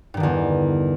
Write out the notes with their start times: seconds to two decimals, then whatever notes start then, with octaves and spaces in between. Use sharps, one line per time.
0.14 G2
0.17 D#3
0.20 D3
0.23 E2